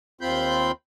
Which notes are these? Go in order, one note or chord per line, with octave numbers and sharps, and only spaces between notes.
D#2 C4 F4 B5 C6 G6